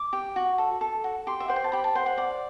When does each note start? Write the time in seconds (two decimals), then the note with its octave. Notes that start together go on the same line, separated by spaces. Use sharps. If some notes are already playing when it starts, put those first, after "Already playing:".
Already playing: D6
0.13 G4
0.36 F#4
0.58 A4
0.81 A4
1.04 F#4
1.27 G4 C6
1.40 E5
1.48 C5 F#5
1.56 G5
1.64 A5
1.72 G4 B5
1.84 A5
1.95 C5 F#5
2.06 F#5
2.17 D5 F#5